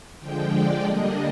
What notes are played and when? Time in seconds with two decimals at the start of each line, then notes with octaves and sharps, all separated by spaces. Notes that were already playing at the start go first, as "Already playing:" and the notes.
0.20 D3 F3 G#3 G5
0.52 D5
0.84 D3 G3 A#3 D4 D#5